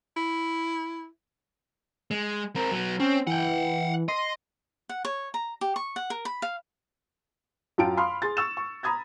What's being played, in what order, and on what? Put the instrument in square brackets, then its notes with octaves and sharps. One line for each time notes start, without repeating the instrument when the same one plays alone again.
[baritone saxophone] E4
[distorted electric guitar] G#3
C4 A#4
F#3 B3
[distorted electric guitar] C4 [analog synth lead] C#4
[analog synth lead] E3 [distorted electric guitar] F#5 G5
[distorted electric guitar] D#5 [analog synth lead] C6
[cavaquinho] F#5
C#5
A#5
G4
C#6
F#5
A#4
B5
F5
[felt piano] F#2 F4 F5 G5 A5 D7
F5 B5 C6 D#6 F6
G#4 C6 A6
C#6 E6 E7
C#6
A#5 B5 D#6 G#6 A6